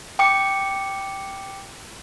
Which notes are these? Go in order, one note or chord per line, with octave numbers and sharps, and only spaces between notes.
G5 D6 C#7